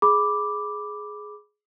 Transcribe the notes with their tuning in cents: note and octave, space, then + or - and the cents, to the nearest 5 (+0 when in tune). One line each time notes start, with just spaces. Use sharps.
G#4 +15 B5 +0 D6 +0